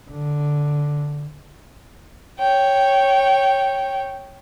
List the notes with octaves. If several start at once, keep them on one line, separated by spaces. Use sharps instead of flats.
D3
C#5 G5